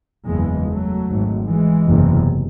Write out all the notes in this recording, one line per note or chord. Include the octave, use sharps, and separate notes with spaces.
F#1 E2 C#3 E3 G#3
F#3 A3
G#1 G#2
E3 G#3
F#1 E2 C3